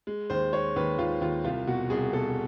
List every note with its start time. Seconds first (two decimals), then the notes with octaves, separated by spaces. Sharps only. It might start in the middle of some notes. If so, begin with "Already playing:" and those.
0.07 G#3
0.30 D#2 C5
0.53 G#3 C#5
0.76 D#2 B4
0.98 D#2 F4
1.21 D#2 F4
1.44 C2 F4
1.67 B2 F#4
1.90 C2 G#4
2.13 B2 A4